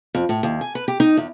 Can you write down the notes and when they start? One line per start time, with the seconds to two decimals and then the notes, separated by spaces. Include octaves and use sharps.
0.15 F2
0.29 A2
0.43 D#2
0.61 G#5
0.75 B4
0.88 G4
1.00 D#4
1.17 E2